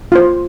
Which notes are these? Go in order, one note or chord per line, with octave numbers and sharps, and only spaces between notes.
F4 C5